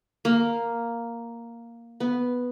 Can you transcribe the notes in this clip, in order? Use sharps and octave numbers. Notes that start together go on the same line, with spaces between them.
A#3
B3